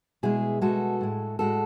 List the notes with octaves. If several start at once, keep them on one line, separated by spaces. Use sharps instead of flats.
B2 G#3 E4 G#4
B2 G#3 F#4 A4
A2 G#3
A2 G#3 F#4 A4